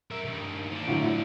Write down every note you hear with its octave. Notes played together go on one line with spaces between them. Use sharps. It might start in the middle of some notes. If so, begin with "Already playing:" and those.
A#4 E5
G2 D#3
F3 D4
A2 D3 F#3
A2